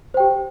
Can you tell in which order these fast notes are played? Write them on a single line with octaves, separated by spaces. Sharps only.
C5 G5 G4